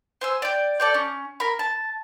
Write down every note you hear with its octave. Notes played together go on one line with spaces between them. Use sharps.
C5 G#5 E6
D5 G5
A4 D5 G5
C#4
A#4 B5
A5